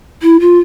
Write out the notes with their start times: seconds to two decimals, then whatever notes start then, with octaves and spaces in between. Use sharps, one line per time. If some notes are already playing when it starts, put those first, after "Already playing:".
0.22 E4
0.40 F4